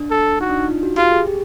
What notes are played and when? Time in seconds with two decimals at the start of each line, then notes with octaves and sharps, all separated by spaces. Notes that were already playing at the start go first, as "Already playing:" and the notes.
Already playing: D4
0.11 A4
0.40 D#4 F#4
0.50 D4
0.59 D#4
0.69 F4
0.83 F#4
0.97 F4 G4
1.12 G#4
1.27 G4